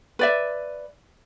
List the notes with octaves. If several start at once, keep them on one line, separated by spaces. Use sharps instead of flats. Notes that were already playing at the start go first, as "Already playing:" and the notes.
B4 D5 E5